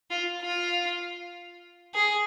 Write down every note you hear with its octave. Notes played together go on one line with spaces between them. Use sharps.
F4
F4
G#4